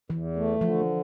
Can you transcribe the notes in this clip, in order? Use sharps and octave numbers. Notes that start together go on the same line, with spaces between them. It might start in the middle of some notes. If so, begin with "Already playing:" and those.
E2 E3
A3
D3 F3